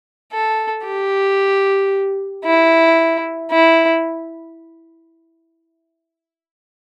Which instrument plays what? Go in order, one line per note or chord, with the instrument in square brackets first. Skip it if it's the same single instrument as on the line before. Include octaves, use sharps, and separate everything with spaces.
[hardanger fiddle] A4
G4
E4
E4